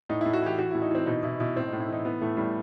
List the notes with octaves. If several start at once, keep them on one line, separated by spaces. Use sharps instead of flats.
A2 D#4
A2 E4
F#4
E3 G4
E3 F#4
A2 E4
D#4
E3 C4
B2 D#4
B2 E4
B2 E4
A2 C4
D#4
A2
E4
E3 D#4
E3 B3
A2 A3
A2 G3